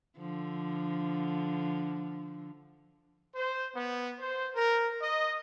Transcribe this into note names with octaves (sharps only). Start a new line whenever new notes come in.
D3 F3
C5
B3
C5
A#4
D#5